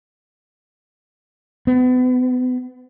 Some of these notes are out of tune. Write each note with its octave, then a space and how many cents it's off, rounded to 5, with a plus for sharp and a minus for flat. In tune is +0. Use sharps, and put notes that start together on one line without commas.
B3 +35